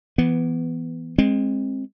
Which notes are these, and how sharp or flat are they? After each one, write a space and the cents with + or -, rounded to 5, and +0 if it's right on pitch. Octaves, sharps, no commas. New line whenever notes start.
E3 +10 B3 +0
G#3 +0 C4 +25